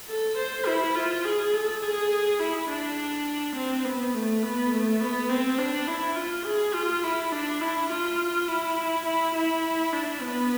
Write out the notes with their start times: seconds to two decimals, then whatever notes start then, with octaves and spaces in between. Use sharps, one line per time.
0.09 A4
0.38 C5
0.66 E4
0.95 F4
1.24 G#4
1.53 A4
1.82 G#4
2.40 E4
2.69 D4
3.56 C4
3.84 B3
4.14 A3
4.43 B3
4.72 A3
5.00 B3
5.29 C4
5.59 D4
5.87 E4
6.16 F4
6.45 G#4
6.74 F4
7.03 E4
7.32 D4
7.61 E4
7.90 F4
8.48 E4
9.06 E4
9.35 E4
9.92 D4
10.21 B3